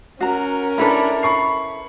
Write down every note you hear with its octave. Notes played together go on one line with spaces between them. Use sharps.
C#4 F#4 A#4 A#5
D4 E4 A4 B4 A#5 B5
B5 C#6 C7